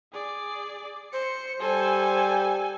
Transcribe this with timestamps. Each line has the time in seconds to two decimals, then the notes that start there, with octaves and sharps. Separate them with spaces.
0.13 G#4 D5
1.13 C5 C#7
1.60 G3 A4 C5 G#5